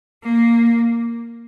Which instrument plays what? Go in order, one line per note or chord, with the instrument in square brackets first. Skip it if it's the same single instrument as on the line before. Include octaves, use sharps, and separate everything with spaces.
[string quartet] A#3